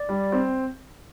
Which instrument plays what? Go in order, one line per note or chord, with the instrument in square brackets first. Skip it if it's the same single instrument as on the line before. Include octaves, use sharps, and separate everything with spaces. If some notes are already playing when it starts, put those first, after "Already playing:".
Already playing: [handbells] D5
[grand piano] G3
C4